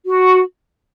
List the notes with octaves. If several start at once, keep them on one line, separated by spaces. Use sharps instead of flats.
F#4